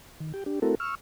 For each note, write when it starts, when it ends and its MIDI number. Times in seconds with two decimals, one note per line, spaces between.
0.20 0.32 51
0.34 0.44 67
0.34 0.44 79
0.46 0.59 62
0.46 0.59 67
0.62 0.75 57
0.62 0.75 60
0.62 0.75 64
0.62 0.75 66
0.62 0.75 69
0.62 0.75 70
0.80 0.95 85
0.80 0.95 88
0.80 0.95 89